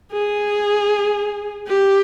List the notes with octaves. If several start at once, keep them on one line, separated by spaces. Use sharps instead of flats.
G#4
G4